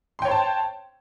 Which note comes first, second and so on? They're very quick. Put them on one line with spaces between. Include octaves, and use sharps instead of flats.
C6 G5 C#5 C5 A5